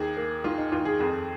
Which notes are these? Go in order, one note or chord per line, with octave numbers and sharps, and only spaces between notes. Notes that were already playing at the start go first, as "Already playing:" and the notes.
Already playing: D#2 G#4
A#3
D#3 F4
D#4
D#2 F4
G#4
F2 G#4